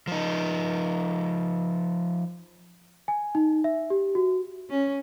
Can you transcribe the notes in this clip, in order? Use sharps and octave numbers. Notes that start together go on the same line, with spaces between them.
F3 D#4
G#5
D#4
E5
G4
F#4
C#4